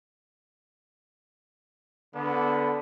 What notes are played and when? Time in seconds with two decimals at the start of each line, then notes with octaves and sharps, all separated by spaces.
2.15 D3 B3